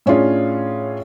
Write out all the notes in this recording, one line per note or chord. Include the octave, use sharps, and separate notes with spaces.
A2 C#4 D4 F4 G#4